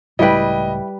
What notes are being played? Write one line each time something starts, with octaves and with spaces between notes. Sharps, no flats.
C#2 A2 G3 E4 B4 D#5 G5